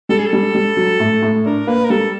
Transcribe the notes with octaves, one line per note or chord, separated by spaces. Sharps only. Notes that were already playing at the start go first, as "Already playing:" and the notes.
G3 A4
G#4
A4
G3
G3
F#3
A2
A2
D4 A#4
A#3 B4
A#4
G3 A4